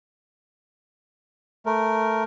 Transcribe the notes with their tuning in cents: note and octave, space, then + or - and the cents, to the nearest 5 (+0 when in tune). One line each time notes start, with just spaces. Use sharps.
A3 +0 A#4 +0